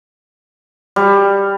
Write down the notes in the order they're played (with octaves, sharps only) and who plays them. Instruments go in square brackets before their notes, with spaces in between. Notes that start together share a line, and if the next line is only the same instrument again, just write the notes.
[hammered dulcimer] G3